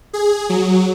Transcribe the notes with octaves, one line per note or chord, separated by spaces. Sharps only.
G#4
F#3